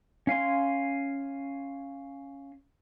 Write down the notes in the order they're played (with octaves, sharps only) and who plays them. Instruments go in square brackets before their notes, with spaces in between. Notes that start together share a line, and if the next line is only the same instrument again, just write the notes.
[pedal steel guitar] C#4 F5 G#5 C6